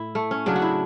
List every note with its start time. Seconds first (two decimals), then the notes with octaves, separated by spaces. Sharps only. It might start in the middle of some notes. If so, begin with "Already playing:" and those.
Already playing: A2 E4
0.15 A3
0.31 C#4
0.46 C#3 F#3 D4
0.56 F#4
0.62 E4